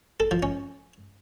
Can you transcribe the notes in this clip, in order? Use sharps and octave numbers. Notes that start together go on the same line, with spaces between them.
A4
F3
C#4